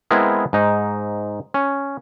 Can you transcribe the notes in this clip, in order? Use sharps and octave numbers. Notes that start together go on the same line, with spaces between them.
G#3 B3 C4 E4 G#4 A#4
G#2 D#4
C#4